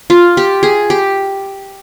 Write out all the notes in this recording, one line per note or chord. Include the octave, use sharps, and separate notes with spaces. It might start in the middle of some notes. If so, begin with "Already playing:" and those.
F4
G4
G#4
G4